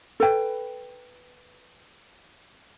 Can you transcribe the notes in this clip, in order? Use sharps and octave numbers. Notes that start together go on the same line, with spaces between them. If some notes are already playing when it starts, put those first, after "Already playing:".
A4 B4 G5